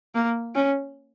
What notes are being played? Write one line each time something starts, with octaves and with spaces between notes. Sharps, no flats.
A#3
C#4